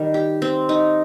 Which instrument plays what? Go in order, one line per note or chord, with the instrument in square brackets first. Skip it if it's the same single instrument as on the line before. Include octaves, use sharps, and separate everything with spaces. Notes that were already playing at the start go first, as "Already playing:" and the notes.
Already playing: [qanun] D#3 G3
G4
C4
D#4